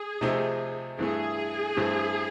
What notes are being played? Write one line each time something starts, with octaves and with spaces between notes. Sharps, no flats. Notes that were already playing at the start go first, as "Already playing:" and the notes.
Already playing: G#4
C3 F3 A3 C4 D#4
G2 E3 A3 G#4
G2 E3 A3 C4